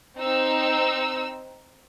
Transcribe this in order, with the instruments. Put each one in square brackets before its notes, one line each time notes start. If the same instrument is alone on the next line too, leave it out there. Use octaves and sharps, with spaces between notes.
[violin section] C4 D#4 E6